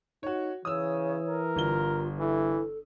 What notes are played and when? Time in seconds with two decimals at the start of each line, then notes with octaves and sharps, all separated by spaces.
0.23 D#4 F#4 C#5
0.65 C#3 E3 C#5 D#6 E6
1.27 A#4
1.56 G1 F4 G7
2.19 E3 E4 A4